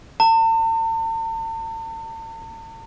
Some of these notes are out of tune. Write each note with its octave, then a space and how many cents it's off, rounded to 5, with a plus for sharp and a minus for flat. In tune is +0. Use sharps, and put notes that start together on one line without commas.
A5 +45